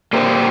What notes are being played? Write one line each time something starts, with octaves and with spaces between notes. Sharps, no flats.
A#2 A#3 G4 C5